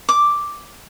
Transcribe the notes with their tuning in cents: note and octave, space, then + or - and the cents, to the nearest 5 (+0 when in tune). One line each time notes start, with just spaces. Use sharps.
D6 +0